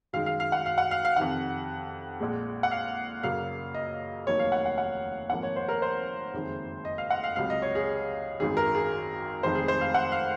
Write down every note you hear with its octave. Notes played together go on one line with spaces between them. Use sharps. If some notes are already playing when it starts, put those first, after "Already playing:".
F#2 D#3 G#3 F5
F5
F5
F#5
F5
F#5
F5
F5
F2 C3 D#3 F#5
A#1 A#2 G#3
F#5
F5
F#2 C#3 F#3 A#3 F5
D#5
F1 D#2 D#3 F#3 A#3 C#5
F5
F#5
F#5
F#5
G#1 G#2 F3 A#3 F#5
C#5
C5
A#4
C5
F#1 F2 D#3 G#3
D#5
F5
F#5
F5
C#2 C3 F#3 F5
D#5
C#5
G#4
G#1 F#2 D#3 G#4
A#4
G#4
F1 F2 D#3 G#3 C5
G#4
C5
F5
F#5
F5